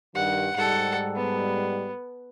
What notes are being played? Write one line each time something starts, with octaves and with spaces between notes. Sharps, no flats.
G2 D#3 G3 F#5
G#2 G3 A4 F#5
B3